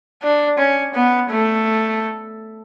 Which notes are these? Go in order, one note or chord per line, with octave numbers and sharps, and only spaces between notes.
D4
C#4
B3
A3